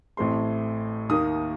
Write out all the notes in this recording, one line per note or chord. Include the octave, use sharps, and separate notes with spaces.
A1 A2 A3 C4 C6
D#2 D#3 A#3 D#6